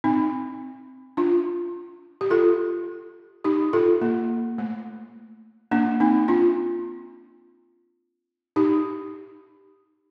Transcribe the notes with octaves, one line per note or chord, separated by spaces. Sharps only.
C4 D#4
D4 F4
G4
F4 A4
D#4 G4
F4 A4
A#3
A3
A#3 D4
C4 D#4
D4 F4
D#4 G4